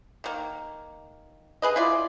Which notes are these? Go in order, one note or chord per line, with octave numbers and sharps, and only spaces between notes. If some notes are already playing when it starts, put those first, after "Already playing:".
D#3 A#3
G#4 B4 D#5
E4 F4 D5